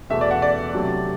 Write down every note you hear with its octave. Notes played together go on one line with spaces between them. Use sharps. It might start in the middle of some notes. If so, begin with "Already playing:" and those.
E2 B2 A3 E5
D5
F#5
D5
C3 F#3 A3 D4